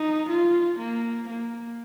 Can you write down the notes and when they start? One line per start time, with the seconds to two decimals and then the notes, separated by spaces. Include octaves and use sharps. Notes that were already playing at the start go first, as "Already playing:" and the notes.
Already playing: D#4
0.30 F4
0.79 A#3
1.29 A#3